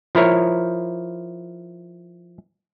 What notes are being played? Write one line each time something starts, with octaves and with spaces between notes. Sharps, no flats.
F3 E4 A#4 C#5